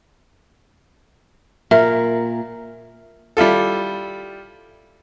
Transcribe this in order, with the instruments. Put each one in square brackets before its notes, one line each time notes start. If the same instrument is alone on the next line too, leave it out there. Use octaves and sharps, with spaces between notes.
[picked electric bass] A#2 [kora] A#4 [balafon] E5
[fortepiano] G3 E4 F4 A4